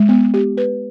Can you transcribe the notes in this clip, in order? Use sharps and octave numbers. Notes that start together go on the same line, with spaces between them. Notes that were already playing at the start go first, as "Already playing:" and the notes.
Already playing: G#3
B3
G4
B4